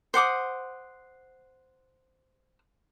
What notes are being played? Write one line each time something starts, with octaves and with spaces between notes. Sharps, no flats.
C5 F#5 D6 D#6